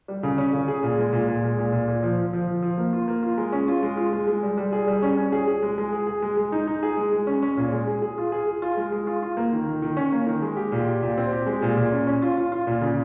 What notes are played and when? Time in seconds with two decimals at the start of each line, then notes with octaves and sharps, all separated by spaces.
0.08 G3
0.23 C#3
0.38 C#4
0.53 C#3
0.68 G#4
0.83 A#2
0.98 G#3
1.13 A#2
1.28 A#2
1.43 G#3
1.58 A#2
1.72 A#2
1.88 A#2
2.03 F3
2.18 F3
2.33 F3
2.47 F3
2.62 F3
2.78 A#3
2.93 F4
3.08 A#3
3.23 F4
3.38 G#3
3.52 C#4
3.68 F4
3.83 G#3
3.97 F4
4.13 G#3
4.28 G#3
4.43 G3
4.57 G3
4.72 G#4
4.88 G3
5.02 C#4
5.17 C#4
5.32 G#4
5.48 G#4
5.63 G#3
5.78 G#3
5.93 G#4
6.07 G#4
6.22 G#3
6.37 G#3
6.52 D#4
6.67 D#4
6.83 G#4
6.97 G#3
7.13 G#3
7.27 C#4
7.42 C#4
7.57 A#2
7.72 G#3
7.87 G#4
8.02 G#4
8.18 F4
8.32 G#4
8.47 G#4
8.62 F4
8.77 G#3
8.92 G#3
9.07 F4
9.22 F4
9.37 A#3
9.52 D#3
9.67 D#3
9.82 D#3
9.97 C#4
10.12 A#3
10.27 D#3
10.42 G#3
10.57 G4
10.72 A#2
10.87 G4
11.02 A#2
11.18 C4
11.33 G4
11.46 G#3
11.62 A#2
11.77 A#2
11.91 C#4
12.07 C#4
12.22 F4
12.37 F4
12.52 F4
12.67 A#2
12.81 C#3